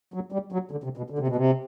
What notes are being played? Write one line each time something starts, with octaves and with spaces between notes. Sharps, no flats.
F#3
G3
F#3
D3
C3
B2
D3
C3
B2
C3